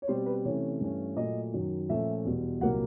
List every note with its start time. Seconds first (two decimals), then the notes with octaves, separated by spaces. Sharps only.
0.02 C#5
0.08 B2 G3 C4 C5
0.26 B4
0.45 C3 E3 A3 C#4 C#5
0.81 G2 E3 A3 C#4
1.16 A#2 F#3 A3 D#5
1.53 F#2 D#3 F#3
1.89 A#2 F3 A3 C#4 E5
2.25 E2 B2 G3
2.61 C2 A#2 F#3 A#3 F#5